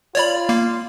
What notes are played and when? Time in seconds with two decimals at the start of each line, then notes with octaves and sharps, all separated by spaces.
0.15 F4 C#5 D5 B5
0.49 A#3